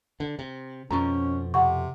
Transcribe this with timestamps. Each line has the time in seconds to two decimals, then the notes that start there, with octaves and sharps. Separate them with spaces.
0.20 D3
0.39 C3
0.91 F2 B2 F3 C#4 A#5 C#6
1.54 C3 F#5 C#6